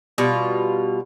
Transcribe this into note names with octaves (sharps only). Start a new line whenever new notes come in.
B2 G3 F4